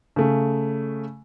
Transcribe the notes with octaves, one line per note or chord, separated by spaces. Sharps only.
C#3 A3